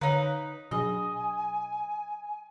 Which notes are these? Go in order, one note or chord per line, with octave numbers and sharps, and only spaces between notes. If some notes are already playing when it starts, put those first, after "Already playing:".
D3 D#4 B4 C#5 F5 A#5
B2 F#3 D4 G#4 D#5 G#5